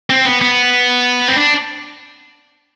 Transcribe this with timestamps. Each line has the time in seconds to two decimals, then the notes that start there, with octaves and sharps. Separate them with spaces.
0.10 C4
0.26 B3
0.41 B3
1.28 C4
1.36 D4